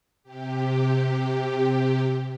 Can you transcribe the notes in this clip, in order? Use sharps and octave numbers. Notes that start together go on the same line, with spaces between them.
C3 G4